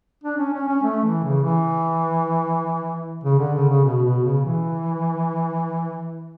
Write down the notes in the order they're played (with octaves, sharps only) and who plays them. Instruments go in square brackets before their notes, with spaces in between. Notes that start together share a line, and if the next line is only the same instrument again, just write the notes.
[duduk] D4
C#4
C#4
C#4
A3
E3
C#3
E3
C#3
D3
C#3
C#3
B2
B2
C#3
E3